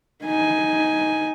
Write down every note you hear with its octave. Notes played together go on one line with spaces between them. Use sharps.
D#4 G#5